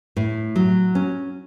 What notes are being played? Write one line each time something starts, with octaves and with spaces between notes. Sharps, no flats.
A2
F#3
C#4